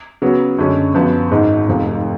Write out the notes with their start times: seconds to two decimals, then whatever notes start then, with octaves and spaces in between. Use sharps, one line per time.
0.22 C#3 F#3 B3
0.58 F#2 D3 G#3 C#4
0.94 F#2 F3 B3
1.31 G#1 G#2 G#3
1.68 F1 F2 F3